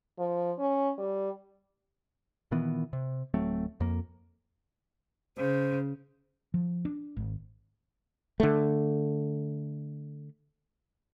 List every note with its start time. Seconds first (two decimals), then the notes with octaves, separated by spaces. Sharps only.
0.19 F3
0.59 C#4
0.98 G3
2.51 A#2 D#3 E3 B3
2.93 C3
3.34 D1 F#3 A3 C4
3.80 F2 A#3
5.38 C#3 C5
6.54 F3
6.85 D4
7.17 G#1
8.40 D3 A3